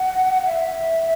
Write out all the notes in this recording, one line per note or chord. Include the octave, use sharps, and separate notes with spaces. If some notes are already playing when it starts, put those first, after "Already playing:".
Already playing: F#5
E5